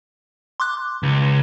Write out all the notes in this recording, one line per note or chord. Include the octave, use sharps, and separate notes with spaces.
C6 D6 F#6
C#2